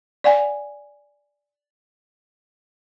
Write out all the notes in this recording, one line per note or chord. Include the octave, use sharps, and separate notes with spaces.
D5 F#5 G#5